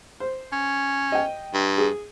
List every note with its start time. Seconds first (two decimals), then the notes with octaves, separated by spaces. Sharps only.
0.20 C5
0.52 C#4
1.12 D#5 G5
1.54 G2
1.78 G#4